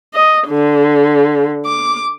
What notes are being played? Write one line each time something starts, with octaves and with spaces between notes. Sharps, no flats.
D#5
D3
D6